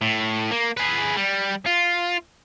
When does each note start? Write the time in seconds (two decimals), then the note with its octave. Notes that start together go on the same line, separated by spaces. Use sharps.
0.02 A2
0.51 A#3
0.77 G#4 B4
1.17 G3
1.66 F4